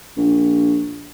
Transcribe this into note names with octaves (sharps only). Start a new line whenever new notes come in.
A#1